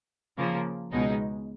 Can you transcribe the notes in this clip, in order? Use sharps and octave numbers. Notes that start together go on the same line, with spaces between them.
C#3 F3 A#3
C#2 B2 G#3 D#4